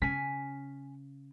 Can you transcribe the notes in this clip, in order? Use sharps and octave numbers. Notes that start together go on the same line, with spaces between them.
C#3 C#4 G#5 B6